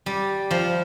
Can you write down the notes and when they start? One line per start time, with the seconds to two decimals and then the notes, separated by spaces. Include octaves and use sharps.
0.06 G3
0.51 F3